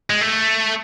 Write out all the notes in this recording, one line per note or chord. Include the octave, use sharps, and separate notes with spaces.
G#3
A3